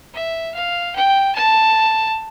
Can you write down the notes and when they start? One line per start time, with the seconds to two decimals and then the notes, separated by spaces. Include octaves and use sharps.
0.14 E5
0.54 F5
0.95 G5
1.35 A5